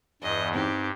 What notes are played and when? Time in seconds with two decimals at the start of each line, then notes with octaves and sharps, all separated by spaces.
0.23 E2 G2 D#5
0.55 C4 D#4 G4